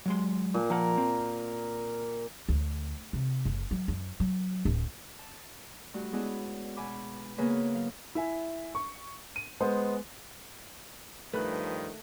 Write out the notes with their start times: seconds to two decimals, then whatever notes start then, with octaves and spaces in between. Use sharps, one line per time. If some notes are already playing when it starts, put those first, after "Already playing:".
0.06 F#3 G#3 C6
0.54 A#2
0.70 F3 A#4 F#5
0.98 C4
2.49 D2
3.13 C3
3.45 F#1
3.71 F#3
3.88 F#2
4.20 F#3
4.65 D1
5.19 A5
5.94 G2 A3 F#4
6.13 G#3 B3 C#4 D4 E4 G#4
6.77 B2 G#5 B5 D6
7.38 C#3 A#3 B3 G#4 B4 C#5
7.73 F#3 F5
8.15 E4 E5 G#5
8.75 C#6
9.36 D#7
9.60 G#3 B3 C5
11.34 G2 D#3 F3 A3 B4 B5 F#6